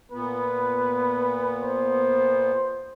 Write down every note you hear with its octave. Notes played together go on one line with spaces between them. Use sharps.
A#2 B3 B4
C5